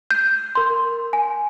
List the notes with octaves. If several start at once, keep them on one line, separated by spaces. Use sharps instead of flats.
G6
A#4 C6
G#5